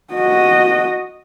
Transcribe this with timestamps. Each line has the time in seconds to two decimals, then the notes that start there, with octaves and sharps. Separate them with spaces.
0.12 F#4 D#5